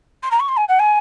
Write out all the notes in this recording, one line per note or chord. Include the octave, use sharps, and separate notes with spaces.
C6
A#5
C#6
C6
G#5
F#5
G#5